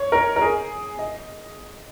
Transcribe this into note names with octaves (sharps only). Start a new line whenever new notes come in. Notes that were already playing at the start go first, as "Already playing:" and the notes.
Already playing: C#5
A#4
A#4
G#4
D#5